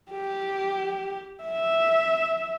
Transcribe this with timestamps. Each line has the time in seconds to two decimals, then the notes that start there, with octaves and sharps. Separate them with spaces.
0.11 G4
1.43 E5